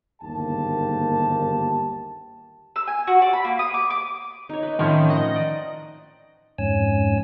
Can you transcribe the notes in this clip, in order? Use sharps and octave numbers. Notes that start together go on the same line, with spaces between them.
G1 D#2 G#2 A#3 G4 A5
E6
G#5
F#4
D5
B5
A#3
D#6
D6
D6
D#4 C#5
B4 D#5
A2 D#3 F3 C4 C#4 D#4 G#5
D#4 D#5 F#5
D5
F2 G#2 C#4 G#5 E6